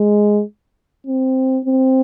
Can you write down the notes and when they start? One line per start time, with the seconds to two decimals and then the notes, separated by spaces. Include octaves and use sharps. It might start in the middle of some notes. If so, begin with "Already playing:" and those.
Already playing: G#3
1.07 C4
1.65 C4